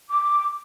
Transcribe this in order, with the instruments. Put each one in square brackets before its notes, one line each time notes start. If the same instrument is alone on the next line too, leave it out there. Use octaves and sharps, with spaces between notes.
[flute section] D6